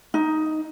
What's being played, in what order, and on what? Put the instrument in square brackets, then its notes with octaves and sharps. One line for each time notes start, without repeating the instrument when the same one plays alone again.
[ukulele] D#4